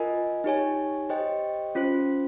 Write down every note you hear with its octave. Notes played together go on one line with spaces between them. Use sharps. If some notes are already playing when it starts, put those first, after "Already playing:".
Already playing: F4 A#4 D#5 G#5
D#4 G4 C#5 G#5
G4 C5 D#5 G5
C#4 F4 C5